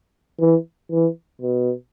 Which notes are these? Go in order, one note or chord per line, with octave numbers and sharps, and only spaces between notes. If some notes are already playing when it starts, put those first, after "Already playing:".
E3
E3
B2